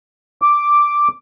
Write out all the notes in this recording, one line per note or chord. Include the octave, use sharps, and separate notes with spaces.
D6